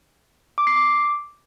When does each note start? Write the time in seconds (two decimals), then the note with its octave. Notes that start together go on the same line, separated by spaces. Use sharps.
0.58 D6
0.67 C7
0.76 D6